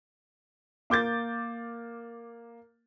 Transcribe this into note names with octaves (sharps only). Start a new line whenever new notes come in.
A#3 D6 G6 A6